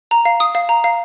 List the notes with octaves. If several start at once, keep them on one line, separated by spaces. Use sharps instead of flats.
A#5
F5
D#6
F5
A#5
F5